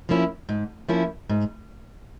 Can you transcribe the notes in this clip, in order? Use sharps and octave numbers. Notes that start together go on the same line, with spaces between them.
F3 A#3 C#4 E4
G#2
F3 A#3 C#4 E4
G#2